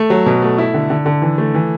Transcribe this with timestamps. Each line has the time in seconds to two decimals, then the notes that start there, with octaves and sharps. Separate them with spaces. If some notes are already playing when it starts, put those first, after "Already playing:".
Already playing: A3
0.10 F#3
0.26 B2
0.42 A3
0.58 E4
0.74 D3
0.90 D3
1.06 D3
1.22 E3
1.38 A3
1.55 E3